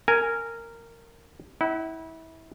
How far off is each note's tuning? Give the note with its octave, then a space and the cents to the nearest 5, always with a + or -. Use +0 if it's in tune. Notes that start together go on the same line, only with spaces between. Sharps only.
A#4 -15 G#5 +0
E4 -25 F#5 +35